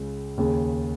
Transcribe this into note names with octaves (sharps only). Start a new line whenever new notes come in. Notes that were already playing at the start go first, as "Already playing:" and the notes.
Already playing: C#2 C#3
D#2 C#3